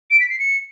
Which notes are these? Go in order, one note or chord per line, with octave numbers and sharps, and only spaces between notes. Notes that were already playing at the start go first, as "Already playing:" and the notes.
D7
B6
C7
C#7